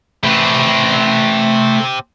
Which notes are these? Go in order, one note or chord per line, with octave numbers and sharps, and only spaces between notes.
A3 C4 G4 B4